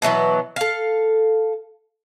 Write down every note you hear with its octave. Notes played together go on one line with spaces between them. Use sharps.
B2 E3 F#3 B3
A4 F5